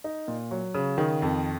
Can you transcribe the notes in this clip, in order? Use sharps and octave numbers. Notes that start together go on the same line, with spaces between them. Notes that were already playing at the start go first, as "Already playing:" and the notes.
D#4
A#2
F#3
C#3
D#3
F2